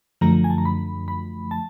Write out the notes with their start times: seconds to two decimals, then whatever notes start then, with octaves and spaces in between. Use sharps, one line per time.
0.21 F#2 D3 F3 A3 A#5
0.44 G#5
0.50 A5
0.58 A#5
0.65 B5
1.08 B5
1.51 A5